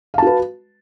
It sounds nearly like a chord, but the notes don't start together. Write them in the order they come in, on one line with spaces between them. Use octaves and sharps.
F5 A5 F#4 B4